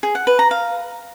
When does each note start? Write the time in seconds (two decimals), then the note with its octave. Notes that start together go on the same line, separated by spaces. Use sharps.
0.03 G#4
0.15 F#5
0.27 B4
0.39 A#5
0.51 F5